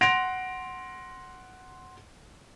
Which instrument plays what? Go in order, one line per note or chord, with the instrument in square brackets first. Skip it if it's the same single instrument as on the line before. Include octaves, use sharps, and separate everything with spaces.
[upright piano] F#5 C6 A#6 D7 F7